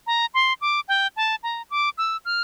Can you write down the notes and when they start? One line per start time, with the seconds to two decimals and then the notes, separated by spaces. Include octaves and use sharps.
0.07 A#5
0.34 C6
0.61 D6
0.88 G5
1.16 A5
1.43 A#5
1.70 D6
1.98 E6
2.25 F6